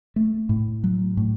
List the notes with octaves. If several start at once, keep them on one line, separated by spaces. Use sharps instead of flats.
A3
A2
F#3
A2